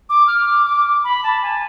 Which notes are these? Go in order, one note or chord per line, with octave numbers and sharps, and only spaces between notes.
D6
F6
D6
D6
B5
A5
G#5